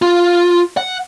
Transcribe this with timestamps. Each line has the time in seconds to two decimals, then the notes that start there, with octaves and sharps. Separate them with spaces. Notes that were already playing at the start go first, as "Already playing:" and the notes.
0.02 F4
0.77 F#5